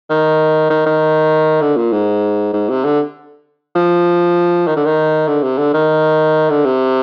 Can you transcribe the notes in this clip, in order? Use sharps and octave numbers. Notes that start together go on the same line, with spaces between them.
D#3
D#3
D#3
D3
A#2
G#2
G#2
C3
D3
F3
D#3
D3
D#3
D3
C3
D3
D#3
D3
C3